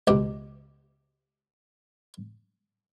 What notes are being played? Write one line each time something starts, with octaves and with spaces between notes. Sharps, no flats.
C#2 B2 G4